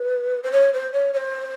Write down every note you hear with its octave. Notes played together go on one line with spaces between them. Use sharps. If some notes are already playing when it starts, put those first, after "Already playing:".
Already playing: B4
C5
C#5
C5
C#5
C#5
C5